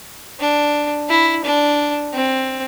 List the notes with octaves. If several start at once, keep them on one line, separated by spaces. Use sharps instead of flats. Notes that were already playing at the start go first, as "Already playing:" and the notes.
D4
E4
D4
C4